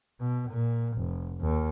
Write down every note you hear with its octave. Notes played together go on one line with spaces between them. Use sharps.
B2
A#2
F1
D#2